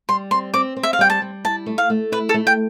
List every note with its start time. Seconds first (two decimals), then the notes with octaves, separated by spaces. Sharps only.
0.09 G3 C6
0.31 C4 C6
0.54 C4 D6
0.76 C4
0.83 E5
0.93 F5
0.99 G3 G5
1.10 A5
1.22 G3
1.44 E4 A5
1.66 A3
1.78 F5
1.90 A3
2.12 E4 B4
2.29 A4
2.34 A3
2.47 G5